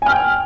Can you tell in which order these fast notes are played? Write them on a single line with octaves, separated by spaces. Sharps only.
G#5 F6 G5